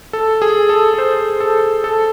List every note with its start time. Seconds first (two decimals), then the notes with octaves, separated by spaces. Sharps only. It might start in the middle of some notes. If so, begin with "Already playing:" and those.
0.13 A4
0.42 G#4
0.69 A4
0.94 A4
0.98 C5
1.40 A4
1.84 A4